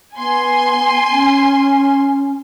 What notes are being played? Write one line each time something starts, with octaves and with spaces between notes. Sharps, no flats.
B3 G#5 C6
C#4